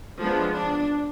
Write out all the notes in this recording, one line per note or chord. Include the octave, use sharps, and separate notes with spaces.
F3 G#3 B3 D4
D4